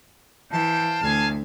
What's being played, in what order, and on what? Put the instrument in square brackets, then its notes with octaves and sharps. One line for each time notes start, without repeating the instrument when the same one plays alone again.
[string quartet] E3 [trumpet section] C5 F5 G5 [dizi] A5
[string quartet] D2 [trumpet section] F5 G#5